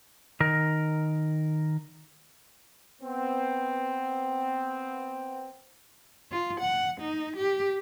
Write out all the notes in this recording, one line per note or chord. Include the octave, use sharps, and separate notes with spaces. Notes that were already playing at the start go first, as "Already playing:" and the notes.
D#3 A#4
B3 C4
F4
F#5
D#4
G4